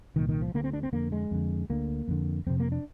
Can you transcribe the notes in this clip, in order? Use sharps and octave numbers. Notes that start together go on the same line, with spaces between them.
C2 A#2 D#3
D#3
F3
D2 D3 A#3
C4
D4
C4
F2 D3 A#3
G#3
F2 D3
D2 D3 A#3
F2 D3
F2 C3 C4
A#3
D4